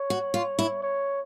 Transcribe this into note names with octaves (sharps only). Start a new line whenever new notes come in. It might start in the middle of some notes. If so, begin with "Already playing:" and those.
Already playing: C#5
F#4
F4
E4
C#5